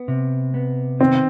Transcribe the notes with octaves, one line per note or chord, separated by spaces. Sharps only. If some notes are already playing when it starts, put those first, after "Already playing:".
Already playing: B3
C3
B3
D#3 C4